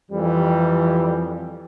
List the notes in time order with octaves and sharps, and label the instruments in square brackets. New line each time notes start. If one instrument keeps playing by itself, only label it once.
[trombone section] F2 G3 [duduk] E3